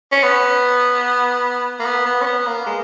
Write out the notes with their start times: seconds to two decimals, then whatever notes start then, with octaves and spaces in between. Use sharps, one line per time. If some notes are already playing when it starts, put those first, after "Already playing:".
0.12 C#4
0.23 B3
1.79 A#3
1.85 B3
2.06 B3
2.21 C#4
2.26 B3
2.47 A#3
2.66 G#3